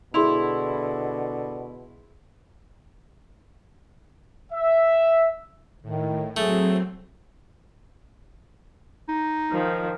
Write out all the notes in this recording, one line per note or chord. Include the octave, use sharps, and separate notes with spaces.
B2 D3 E4 G#4 C6 F7
E5
A2 D#3
F#3 A3 C4 G#4
D#4
D#3 F3